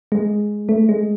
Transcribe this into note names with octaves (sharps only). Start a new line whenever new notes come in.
G#3
A3
G#3